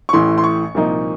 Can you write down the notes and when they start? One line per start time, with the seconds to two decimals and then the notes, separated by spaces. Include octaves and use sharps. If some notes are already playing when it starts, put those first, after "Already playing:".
0.09 C#6
0.13 A1 A2 E3 C6
0.38 C6
0.44 C#6
0.74 C2 A#2 F3 A#3 D#4